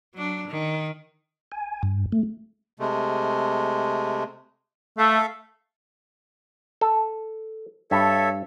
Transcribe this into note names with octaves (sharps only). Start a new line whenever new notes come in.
F#3 D4
D#3
G#5
G2
A3
C3 G#3 A3
A3 A4 E5 F5
A4
G2 A4 C#5 E5